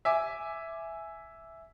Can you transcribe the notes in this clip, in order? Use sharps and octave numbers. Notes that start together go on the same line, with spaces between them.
E5 G#5 D6